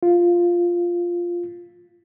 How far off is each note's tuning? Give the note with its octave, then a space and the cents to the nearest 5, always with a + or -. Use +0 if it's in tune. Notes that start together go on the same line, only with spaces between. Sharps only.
F4 +0